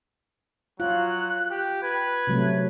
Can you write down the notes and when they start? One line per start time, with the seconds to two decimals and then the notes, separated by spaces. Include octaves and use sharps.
0.80 F#3 F4 F#6
1.51 G4
1.83 B4 G#6
2.27 C3 F#3 A3